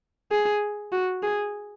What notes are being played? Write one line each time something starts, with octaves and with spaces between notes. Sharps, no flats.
G#4
F#4
G#4